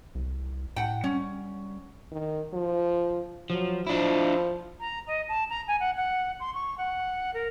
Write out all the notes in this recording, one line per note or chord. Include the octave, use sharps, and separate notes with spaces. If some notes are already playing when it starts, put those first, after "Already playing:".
C2
A2 F#5 G5
G3 C#4
D#3
F3
F3 F#3
F3 D4 E4
A#5
D#5
A5
A#5
G#5
F#5
F#5
C6
C#6
F#5
A#4